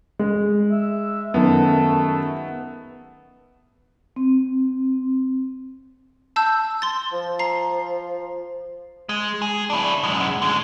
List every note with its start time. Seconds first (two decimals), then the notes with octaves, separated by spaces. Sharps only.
0.19 G#3
0.71 E5
1.34 F#2 D#3 A3 B3
4.16 C4
6.36 A5 E6 G6
6.82 C6 A6
7.13 F3
7.39 A#5 C7
9.09 G#3
9.42 G#4
9.70 D4 E4
10.03 F#2 G#3
10.42 D3 G#3